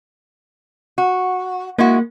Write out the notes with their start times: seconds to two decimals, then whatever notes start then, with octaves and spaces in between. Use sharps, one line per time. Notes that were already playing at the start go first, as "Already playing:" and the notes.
0.98 F#4
1.78 G#3 A#3 E4 F#4